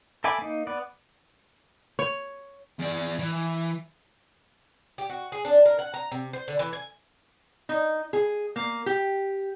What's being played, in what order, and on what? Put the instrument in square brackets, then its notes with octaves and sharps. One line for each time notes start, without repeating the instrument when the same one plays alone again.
[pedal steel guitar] A4 E5 G#5 B5 D6
A#3 D#4
B3 D5
[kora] C#5
[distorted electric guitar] E2 D5
E3
[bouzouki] G4
F#4
G#4
D4
A#4
F#5
A#5
C3
C5
D3
E3
G#5
[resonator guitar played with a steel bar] D#4
G#4
A#3
G4